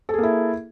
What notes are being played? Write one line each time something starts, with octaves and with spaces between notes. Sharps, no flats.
A#3 E4 G#4 A4